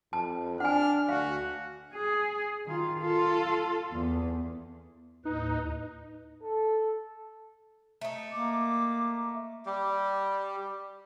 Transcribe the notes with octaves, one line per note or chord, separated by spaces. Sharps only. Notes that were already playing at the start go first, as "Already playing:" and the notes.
F2 A5
D4 F#5 G#5 F6
D2 F#4 F5
G#4
D#3 F4
F4 A4
E2
D#2 A2 D#4 B4
A4
A3 D#4
A#3 D6
G3 G4